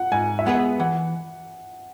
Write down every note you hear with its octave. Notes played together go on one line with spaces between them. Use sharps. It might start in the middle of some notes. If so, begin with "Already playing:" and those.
Already playing: F#5
G#2 G#5
E5
G#3 B3 G#4 B4 F#5
E3 F#5